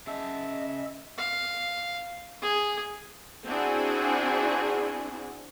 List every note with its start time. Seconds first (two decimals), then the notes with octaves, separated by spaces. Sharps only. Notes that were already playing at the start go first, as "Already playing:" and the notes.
0.07 C#4 G#4 D#5 E5 A5
1.17 F5
2.42 G#4
3.47 C4 D4 E4 F#4 G#4